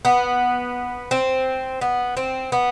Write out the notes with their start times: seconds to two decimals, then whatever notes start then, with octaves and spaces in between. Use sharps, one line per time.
0.05 B3
1.11 C4
1.81 B3
2.17 C4
2.52 B3